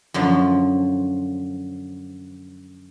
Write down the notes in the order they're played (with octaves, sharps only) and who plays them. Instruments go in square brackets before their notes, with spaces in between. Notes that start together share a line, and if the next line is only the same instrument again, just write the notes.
[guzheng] F#2 D3 F3